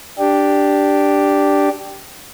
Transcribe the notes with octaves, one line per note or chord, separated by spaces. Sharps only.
D4 G4